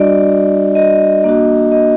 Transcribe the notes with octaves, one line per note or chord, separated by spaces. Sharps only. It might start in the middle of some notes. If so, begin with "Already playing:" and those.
Already playing: G3 D4 F#4 D5 D#5
D#5
A#3 D4 F#4
D#5